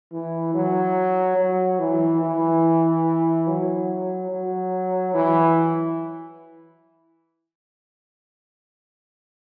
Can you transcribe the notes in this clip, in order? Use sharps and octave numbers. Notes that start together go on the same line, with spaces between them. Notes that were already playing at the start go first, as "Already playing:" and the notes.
E3
F#3
F#3
E3
E3
F#3
F#3
E3